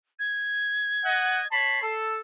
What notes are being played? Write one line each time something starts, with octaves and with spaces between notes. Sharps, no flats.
G#6
D#5 F#5
C#5 A5 B5 C7
A4